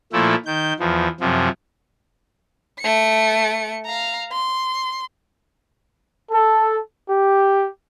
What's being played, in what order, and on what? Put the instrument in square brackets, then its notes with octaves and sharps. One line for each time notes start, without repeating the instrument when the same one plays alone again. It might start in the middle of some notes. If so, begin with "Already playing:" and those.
[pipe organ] A#2 F3 A3 E4
D#3 G6
E2 F3
F#2 C3 F3
[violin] A3 C#7
F5 A#5
C6
[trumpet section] A4
G4